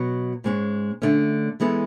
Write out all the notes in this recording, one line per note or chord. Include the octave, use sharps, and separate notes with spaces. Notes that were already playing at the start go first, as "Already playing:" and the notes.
Already playing: B2 F#3 B3
G#2 G#3 C#4
D3 A3 C#4
E3 G#3 B3 E4 A4